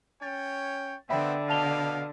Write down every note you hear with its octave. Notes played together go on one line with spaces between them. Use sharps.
C#4 C#5 G5 A6
D3 B3 C4 E5 G5 B5
B2 B3 F5 A5 F7 G7